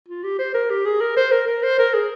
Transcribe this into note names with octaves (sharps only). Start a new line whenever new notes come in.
F4
G4
C5
A#4
G4
G#4
A#4
C5
A#4
A#4
C5
A#4
G#4